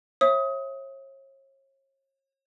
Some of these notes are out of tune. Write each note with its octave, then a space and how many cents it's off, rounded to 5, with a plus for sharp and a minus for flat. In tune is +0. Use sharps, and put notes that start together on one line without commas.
C#5 -40 E5 +0 D#6 +25